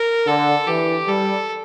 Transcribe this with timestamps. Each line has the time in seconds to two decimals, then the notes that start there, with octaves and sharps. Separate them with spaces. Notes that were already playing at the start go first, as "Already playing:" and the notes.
Already playing: A#4
0.26 D3 A4
0.67 E3 G4
1.07 G3 A4